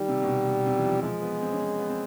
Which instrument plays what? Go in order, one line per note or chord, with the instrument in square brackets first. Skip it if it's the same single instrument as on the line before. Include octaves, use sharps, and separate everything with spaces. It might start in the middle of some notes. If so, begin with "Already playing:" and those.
Already playing: [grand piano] D#3 [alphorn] G3
[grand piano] C3
B2
C3
B2
C3
E3
F3
[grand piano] F3 [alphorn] G#3
[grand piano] B3
C4
C#4
C4
B3
C4